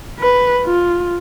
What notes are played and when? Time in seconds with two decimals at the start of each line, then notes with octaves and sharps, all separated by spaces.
0.20 B4
0.65 F4